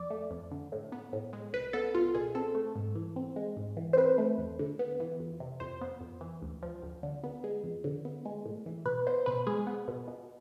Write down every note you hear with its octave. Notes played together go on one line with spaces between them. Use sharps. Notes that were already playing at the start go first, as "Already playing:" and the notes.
Already playing: F2 D5
A3
F2
D3
A2
B3
A2
G#3
C2 B4
B3 A4
C2 F4
B2 G#4
C4 A4
A3
G#2
E3
C4
G#3
G#2
E3
C5
C4 B4
A3
E2
D3
B3
E3
F2
C3
F2 C5
B3
F2
E3
D2
F3
D2
D3
B3
G#3
F2
D3
B3
G#3
A2
E3
B2 B4
B3 C5
B2 B4
G#3 G#4
B3
B2
B2